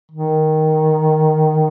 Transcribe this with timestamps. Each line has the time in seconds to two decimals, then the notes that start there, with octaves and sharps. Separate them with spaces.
0.12 D#3